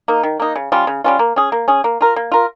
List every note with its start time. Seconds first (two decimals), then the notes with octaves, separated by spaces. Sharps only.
0.08 A#3 D#4
0.23 D#3
0.40 A#3 D#4
0.56 C#3
0.72 G3 C#4 F4
0.87 C#3
1.04 G3 C#4 F4
1.19 A#3
1.36 C#4 G#4
1.52 A#3
1.68 C#4 G#4
1.84 A#3
2.01 F4 A#4
2.16 A#3
2.32 F4 A#4